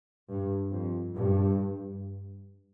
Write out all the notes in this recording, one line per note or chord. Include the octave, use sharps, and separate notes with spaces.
G2
F2
G2